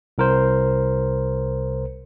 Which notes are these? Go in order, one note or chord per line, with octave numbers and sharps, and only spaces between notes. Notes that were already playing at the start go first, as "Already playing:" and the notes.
C2 A#4 C5